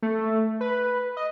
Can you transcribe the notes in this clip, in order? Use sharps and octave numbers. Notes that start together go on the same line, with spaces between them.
A3
B4
D#5